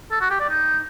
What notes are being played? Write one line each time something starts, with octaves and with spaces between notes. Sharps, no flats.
A4
F#4
G4
D5
D#4